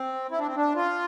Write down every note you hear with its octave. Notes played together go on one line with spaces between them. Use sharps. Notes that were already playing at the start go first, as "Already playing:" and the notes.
Already playing: C4
E4
D4
C4
D4
F4